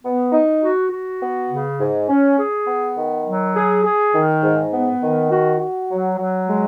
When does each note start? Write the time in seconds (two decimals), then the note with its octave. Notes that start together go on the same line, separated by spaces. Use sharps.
0.03 B3
0.32 D#4
0.61 F#4
0.90 F#4
1.20 B3
1.49 C#3
1.79 G#2
2.08 C#4
2.38 G#4
2.66 B3
2.97 D#3
3.25 F#3
3.55 G#4
3.84 G#4
4.13 D#3
4.42 G#2
4.72 B3
5.01 D#3
5.31 F#4
5.60 F#4
5.89 F#3
6.18 F#3
6.48 G#3